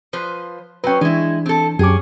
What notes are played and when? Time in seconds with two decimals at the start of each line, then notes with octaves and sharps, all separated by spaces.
0.13 F3 B4 C5
0.84 F#3 C#4 B4 G5
1.01 E3 G#3 D4 E4
1.46 C4 A4
1.79 F#2 C#4 G4 G#4 D6